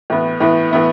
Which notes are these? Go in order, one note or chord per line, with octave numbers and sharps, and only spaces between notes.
A2 E3 B3
A2 E3 B3
A2 E3 B3 E4